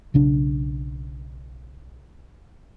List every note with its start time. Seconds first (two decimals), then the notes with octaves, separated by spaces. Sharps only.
0.14 B1 C#3 D4